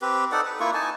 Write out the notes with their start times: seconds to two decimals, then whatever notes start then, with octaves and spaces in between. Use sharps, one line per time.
0.02 C4 G4 B4
0.32 D#4 A4 D5 F#5
0.45 B4
0.60 A#3 E4 F4 C#6
0.74 D#4 G#5 A5